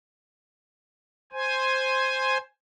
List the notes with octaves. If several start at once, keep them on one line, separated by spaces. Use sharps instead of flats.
C5 G#5